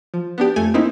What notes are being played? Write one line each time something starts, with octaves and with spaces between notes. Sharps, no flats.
F3
B3 D4 G4
F2 A3 G#5
A#3 C4 D#4 E4